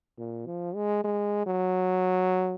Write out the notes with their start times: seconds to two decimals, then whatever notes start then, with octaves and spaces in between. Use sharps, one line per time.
0.18 A#2
0.46 F3
0.75 G#3
1.04 G#3
1.46 F#3